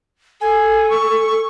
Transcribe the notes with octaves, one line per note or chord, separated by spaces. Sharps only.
A4 G#5
C#6